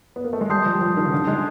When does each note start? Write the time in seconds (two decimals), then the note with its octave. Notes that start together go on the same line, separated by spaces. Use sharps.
0.16 B3
0.25 A#3
0.33 A3
0.41 G#3
0.49 G3 A5 C6 D#6 G6 C7
0.66 F3
0.81 F3
0.97 D#3
1.05 C#3
1.12 D3
1.27 G#3